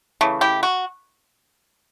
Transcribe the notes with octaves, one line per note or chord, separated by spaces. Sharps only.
C#3 E3 A3
E4 G4
F#4